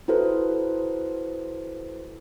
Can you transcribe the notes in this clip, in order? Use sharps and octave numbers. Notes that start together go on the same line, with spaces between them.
E4 F#4 A4 B4 C5